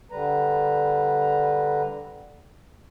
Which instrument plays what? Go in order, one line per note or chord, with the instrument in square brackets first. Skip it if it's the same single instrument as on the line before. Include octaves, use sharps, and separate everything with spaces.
[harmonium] D3 G3 B4 A#5